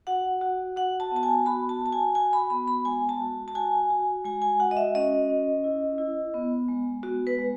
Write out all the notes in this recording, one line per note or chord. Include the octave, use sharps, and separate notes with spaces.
F#4 F#5
F#4
F#4 F#5
A5
B3 A5
G#5
F#4 B5
A5
F#4 A5
G#5
F#4 G#5
B5
B3 B5
B5
G#3 G#5
A5
F#4
A5
F#4 G#5
F#4
G#3 G#5
G#5
F#4 F#5
D#5
E5
C#4 D#5
C#4
E4
E4
B3
G#3
B3 F#4
B4
G#3